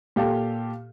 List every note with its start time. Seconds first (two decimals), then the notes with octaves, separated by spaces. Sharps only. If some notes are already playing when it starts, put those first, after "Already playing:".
0.16 A#2 G4 A4 F5